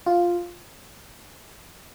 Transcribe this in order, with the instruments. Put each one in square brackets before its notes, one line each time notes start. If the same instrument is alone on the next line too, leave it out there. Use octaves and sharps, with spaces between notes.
[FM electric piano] F4